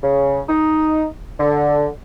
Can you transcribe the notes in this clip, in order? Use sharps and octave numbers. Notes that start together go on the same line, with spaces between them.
C#3
D#4
D3